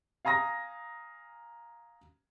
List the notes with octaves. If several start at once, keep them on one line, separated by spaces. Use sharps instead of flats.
F5 G#5 A#5 D#6 A#6